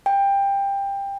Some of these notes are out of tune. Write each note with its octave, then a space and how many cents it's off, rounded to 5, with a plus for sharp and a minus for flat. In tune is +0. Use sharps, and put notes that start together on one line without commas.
G5 +20